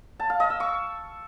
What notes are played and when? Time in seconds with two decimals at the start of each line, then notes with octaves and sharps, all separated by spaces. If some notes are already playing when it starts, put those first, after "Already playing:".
0.20 A5
0.30 F5
0.40 D#5
0.50 E6
0.60 C#6